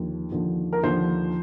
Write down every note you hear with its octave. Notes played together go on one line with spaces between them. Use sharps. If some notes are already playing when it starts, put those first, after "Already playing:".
Already playing: D#2 D3 F3
D#2 D3 F3
A#4
D#2 D3 F3 C5